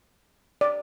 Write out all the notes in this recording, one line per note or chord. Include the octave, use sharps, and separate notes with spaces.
D5